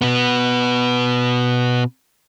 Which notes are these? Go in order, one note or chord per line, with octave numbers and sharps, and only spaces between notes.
B2 B3